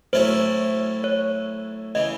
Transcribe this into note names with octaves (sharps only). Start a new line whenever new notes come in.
A2 F#3 A3 C#4 E4 C5
C#5
C#3 E3 D#5